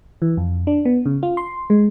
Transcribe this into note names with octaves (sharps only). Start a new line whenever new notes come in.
E3
F2
D4
B3
C#3
F4
C6
G#3